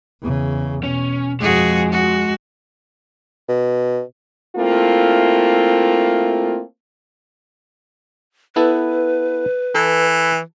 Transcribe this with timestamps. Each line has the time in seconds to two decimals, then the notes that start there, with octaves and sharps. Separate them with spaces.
0.22 E2 C#3
0.83 B2 C#4
1.41 F2 F3 G#3 F#4 G#4
1.92 F#4
3.49 B2
4.56 A3 A#3 C4 E4 F4
8.56 B3 E4 A4 B4
9.75 E3 A4